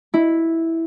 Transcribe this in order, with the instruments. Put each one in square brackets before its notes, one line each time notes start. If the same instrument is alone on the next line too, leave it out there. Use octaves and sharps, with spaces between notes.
[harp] E4